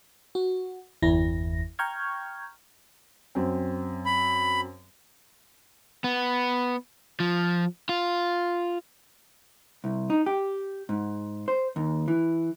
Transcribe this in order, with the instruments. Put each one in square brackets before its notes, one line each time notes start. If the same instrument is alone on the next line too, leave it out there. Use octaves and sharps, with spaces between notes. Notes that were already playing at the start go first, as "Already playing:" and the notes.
[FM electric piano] F#4
G1 E2 E4 A#6
G5 A#5 C#6 F6 G6 G#6
[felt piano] F#2 C4
[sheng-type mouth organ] B5
[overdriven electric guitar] B3
F3
F4
[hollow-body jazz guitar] C2
D#4
G4
G#2
C5
D#2
E3